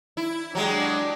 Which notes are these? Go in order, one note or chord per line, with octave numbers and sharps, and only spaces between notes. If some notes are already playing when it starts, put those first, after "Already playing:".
E4
F#3 G#3 D4 G4